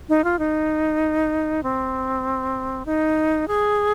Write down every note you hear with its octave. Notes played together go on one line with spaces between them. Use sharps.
D#4
F4
D#4
C4
D#4
G#4